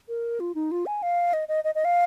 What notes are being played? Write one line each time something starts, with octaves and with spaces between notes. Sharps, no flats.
A#4
F4
D#4
F4
G#5
F5
D#5
D#5
D#5
D#5
F5